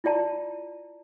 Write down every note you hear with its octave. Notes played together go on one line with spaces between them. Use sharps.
E4 F4 D5 A5 A#5